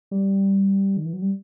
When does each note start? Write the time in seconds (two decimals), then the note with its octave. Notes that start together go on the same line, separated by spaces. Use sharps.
0.11 G3
0.97 D#3
1.05 E3
1.13 F#3
1.22 G3